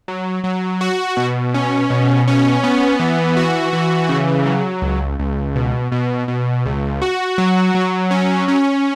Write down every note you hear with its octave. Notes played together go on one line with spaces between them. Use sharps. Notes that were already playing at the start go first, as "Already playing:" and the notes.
F#3
F#3
F#4
B2
C#4
B2
C#4
B3
E3
F#4
E3
C#3
F#3
C#2
C#2
B2
B2
B2
C#2
F#4
F#3
F#3
C#4
C#4